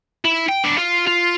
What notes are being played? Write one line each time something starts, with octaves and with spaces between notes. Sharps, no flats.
E4
G5
B3 D4
F4
F4